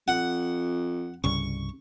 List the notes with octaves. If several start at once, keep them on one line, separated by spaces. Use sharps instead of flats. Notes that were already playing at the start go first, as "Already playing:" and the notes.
F2 F#5
C2 G2 C#3 C#6